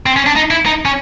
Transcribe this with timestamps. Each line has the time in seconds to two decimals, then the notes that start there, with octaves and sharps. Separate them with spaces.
0.06 C4
0.16 C#4
0.26 D4
0.36 D#4
0.51 E4
0.66 D#4
0.85 C#4